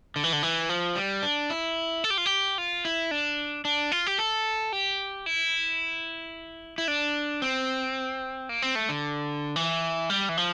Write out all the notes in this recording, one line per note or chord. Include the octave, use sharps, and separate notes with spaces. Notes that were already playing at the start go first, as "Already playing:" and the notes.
D3
E3
D3
E3
F3
G3
D4
E4
A4
G4
F4
G4
F4
E4
D4
D4
F4
G4
A4
G4
E4
E4
D4
C4
A#3
C4
A3
D3
E3
G3
E3
F3